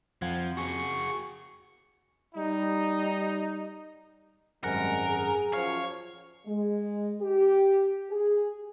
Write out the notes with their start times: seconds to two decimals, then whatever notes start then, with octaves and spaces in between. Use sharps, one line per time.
0.22 F2 F3 F#5 G#6
0.57 F#4 G#4 C#6
2.35 G3 D#4
4.64 G#1 F#2 G3 G#3 C4 A#4 F#5 G#5
5.10 G#4
5.53 F#2 F3 C#5 F5
6.46 G#3
7.22 G4
8.10 G#4